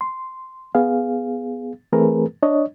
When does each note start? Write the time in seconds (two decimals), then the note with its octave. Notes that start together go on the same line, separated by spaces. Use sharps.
0.01 C6
0.75 B3 G#4 F5
1.92 E3 A3 C4 G#4 A#4 B4
2.43 D4 C#5 D#5